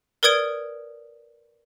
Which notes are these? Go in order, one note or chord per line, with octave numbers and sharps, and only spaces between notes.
A#4 B4 D5 D#6 G#6 D7